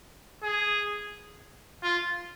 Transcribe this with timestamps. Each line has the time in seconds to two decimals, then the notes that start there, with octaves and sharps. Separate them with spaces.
0.43 G#4
1.83 F4